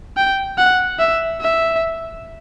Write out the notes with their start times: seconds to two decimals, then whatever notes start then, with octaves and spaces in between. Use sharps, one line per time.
0.17 G5
0.58 F#5
0.99 E5
1.41 E5